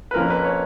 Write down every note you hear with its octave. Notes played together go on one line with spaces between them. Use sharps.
B4
F2 F3 A#3 C#4 A#4
B4
C#5